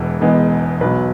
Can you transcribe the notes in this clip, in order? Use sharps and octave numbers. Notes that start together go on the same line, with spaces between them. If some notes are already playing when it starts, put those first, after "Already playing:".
Already playing: E1 E2 E3 G#3 B3
E1 E2 E3 G#3 B3
B1 B2 F#3 B4